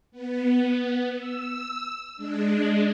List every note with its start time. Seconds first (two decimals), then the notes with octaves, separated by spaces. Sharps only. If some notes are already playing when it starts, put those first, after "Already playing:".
0.12 B3
1.16 E6
2.16 G#3 D4